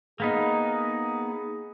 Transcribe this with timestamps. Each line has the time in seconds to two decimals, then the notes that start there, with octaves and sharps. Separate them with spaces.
0.20 A#3 B3 D#4 G#4